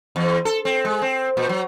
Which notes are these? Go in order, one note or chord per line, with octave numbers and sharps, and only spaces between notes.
E2
A4
C4
G#3
C4
A#2
F#3